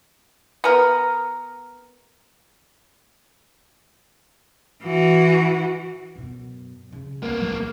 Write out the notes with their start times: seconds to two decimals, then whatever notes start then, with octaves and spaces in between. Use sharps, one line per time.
0.64 B3 A#4
4.84 E3 F#4
6.15 F#2 B2
6.91 C#3 F#3
7.23 C2 G2 A#3 B3 C#4
7.40 D1 B1 F#3 G#3